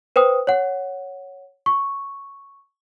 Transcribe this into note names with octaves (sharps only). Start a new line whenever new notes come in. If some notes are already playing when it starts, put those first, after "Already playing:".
B4 C5 G5 D#6
C#5 F#5
C#6